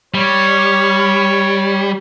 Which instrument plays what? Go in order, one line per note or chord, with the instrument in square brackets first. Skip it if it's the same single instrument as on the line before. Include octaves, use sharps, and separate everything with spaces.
[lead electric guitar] G3 [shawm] C#5